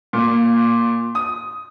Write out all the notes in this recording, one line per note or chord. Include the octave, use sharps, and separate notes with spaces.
A#2
D#6